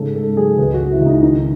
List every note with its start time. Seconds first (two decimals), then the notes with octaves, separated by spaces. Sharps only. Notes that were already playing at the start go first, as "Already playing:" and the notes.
Already playing: G#2 C#3 A4
0.14 G#2 A4
0.37 F#3 G#4
0.58 C#2 B4
0.74 F#4
0.80 C#2
0.91 E4
1.01 C#2
1.06 D#4
1.22 D#3 D#4